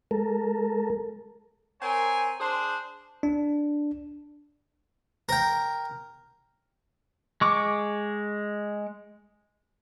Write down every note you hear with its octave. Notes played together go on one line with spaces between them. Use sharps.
G#3 A4 A#4
C4 A#4 C#5 G#5
D4 G#4 C5
D4
A#4 G5
G#3 C#6 D6